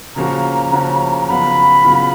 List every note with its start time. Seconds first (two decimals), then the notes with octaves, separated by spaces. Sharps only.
0.16 C#3 F3 A#3 C#4 F#4 A#5
0.72 C#3 F3 A#3 C#4 F#4
1.18 A#5
1.29 C#3 F#3 B3 F4 B5
1.84 C#3 F#3 B3 F4